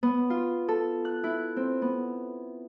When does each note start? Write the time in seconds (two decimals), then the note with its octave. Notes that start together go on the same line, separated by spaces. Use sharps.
0.03 B3
0.30 F4
0.68 A4
1.05 F#6
1.24 E4
1.56 C4
1.82 B3